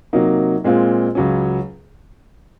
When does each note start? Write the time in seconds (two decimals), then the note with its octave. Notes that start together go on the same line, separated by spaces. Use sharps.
0.13 C3 F#3 A#3 D#4
0.64 A#2 G#3 C4 F4
1.15 C#2 C#3 F#3 C#4